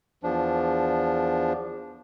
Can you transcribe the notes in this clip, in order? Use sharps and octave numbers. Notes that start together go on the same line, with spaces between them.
E2 F3 D4